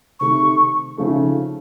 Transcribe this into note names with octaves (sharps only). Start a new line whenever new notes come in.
C3 D#3 A3 C#6
C#3 F3 A3 D#4